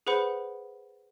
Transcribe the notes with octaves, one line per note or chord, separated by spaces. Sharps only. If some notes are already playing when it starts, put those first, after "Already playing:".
G#4 B4 C5 F#5 B5